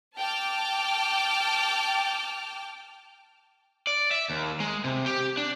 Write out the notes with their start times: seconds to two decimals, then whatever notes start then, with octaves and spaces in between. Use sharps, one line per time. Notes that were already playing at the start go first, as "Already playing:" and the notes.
0.19 G5 A5 D6 F6
3.87 D5
4.11 E5
4.30 D#2
4.60 G#3
4.84 C3
5.06 G4
5.37 D4